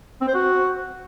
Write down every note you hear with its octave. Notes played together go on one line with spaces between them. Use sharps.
C4
C5
F#4